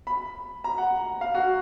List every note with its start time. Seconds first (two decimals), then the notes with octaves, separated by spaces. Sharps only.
0.07 B5
0.64 A#5
0.78 F#5
1.21 F5
1.35 F#4